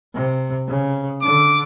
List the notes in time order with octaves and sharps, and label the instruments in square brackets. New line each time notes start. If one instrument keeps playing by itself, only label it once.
[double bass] C3
C#3
[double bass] D3 [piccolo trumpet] D6